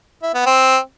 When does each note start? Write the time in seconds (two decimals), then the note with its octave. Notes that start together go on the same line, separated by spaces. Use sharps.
0.23 E4
0.34 B3
0.46 C4